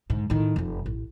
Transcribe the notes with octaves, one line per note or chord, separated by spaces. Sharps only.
G#2 D3
A2 D#3
F1 F2
A1